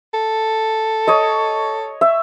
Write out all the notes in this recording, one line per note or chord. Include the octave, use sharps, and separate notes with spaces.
A4
C#5 D#5
E5